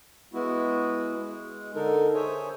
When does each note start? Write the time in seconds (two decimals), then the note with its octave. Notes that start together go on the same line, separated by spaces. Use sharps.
0.34 G#3 B3 E4 F#4
1.19 G#3
1.75 D3 D#4 A4 A#4
2.15 G#4 C5 C#5 E5 G#5